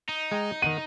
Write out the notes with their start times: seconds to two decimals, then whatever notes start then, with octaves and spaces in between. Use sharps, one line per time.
0.09 D#4
0.31 G#3 G5 A#5
0.62 D#3 F#5 D#7